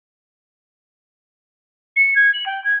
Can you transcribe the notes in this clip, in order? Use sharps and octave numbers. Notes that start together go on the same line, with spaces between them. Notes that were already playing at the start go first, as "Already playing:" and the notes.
C#7
G#6
F#7
G5
G#6